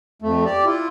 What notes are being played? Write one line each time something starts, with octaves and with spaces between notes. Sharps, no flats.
F2 A3
G4 D5
E4 F4